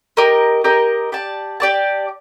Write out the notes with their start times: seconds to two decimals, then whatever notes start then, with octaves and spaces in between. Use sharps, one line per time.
0.17 G4 A#4 D#5
0.64 G4 A#4 D#5
1.12 G4 D5 A5
1.60 G4 D5 A5